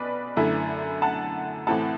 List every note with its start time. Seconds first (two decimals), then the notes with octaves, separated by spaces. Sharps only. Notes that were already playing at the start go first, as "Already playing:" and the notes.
Already playing: B1 B2 B4 D5
0.36 F#2 D3 A3 E4
1.02 F#5 A5
1.67 A2 E3 A3 C4 F#5 A5